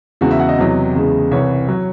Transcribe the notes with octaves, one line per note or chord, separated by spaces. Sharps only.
E2 C#3 G#3 F#4
E5
F#5
D#5
E2 C3 F#3
E2 C#3 G#3
C2 C3 E3 C#5
F#3